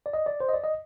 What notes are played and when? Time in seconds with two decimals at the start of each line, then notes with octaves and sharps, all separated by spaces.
0.06 D5
0.13 D#5
0.26 D5
0.40 C5
0.49 D#5
0.54 D5
0.64 D#5